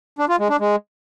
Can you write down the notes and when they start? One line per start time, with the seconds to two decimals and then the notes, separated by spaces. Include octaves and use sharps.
0.19 D4
0.29 F4
0.39 G#3
0.50 D4
0.60 G#3